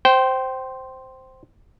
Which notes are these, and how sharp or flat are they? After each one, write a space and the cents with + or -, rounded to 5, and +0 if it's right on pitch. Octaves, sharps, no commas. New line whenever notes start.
C5 +0 G5 -20